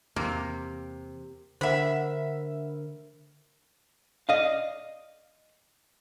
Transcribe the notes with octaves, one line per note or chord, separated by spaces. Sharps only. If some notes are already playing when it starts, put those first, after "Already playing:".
E2 C3 A#3
D3 A#4 C5 E5 F#5 B5
D5 D#5 F5